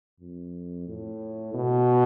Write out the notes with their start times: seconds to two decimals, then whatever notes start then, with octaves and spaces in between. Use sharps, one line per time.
0.20 F2
0.88 A2
1.54 B2